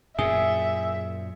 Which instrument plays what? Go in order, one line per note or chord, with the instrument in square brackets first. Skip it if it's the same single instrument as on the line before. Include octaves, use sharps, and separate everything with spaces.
[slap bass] F#2 A#2 [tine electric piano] G#4 [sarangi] E5